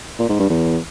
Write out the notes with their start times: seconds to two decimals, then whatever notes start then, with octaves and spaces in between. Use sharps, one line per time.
0.19 A#2
0.29 G#2
0.39 G2
0.50 E2